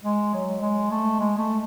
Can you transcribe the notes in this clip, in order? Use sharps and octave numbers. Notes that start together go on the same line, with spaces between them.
G#3
F#3
G#3
A3
G#3
A3